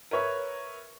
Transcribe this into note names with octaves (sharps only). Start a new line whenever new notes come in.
A#4 B4 C#5 E5